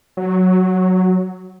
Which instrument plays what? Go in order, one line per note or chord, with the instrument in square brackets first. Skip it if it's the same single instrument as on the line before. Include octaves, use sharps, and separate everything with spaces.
[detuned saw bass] F#3